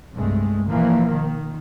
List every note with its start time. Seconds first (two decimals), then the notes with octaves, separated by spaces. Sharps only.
0.14 C2 G2 G#3 A3
0.68 B2 E3 F3 A#3
1.11 D#3